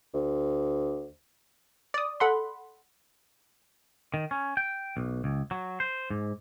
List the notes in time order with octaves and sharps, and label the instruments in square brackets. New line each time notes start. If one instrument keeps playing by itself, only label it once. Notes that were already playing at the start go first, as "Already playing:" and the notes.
[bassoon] D2
[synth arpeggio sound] D5 D#6
A4 F#5 B5 C6
[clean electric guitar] D#3
C#4
G5
B1
C#2
F#3
C5
G#2